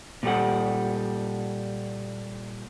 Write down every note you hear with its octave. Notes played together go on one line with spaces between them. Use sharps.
A#2 G3 A4 F#5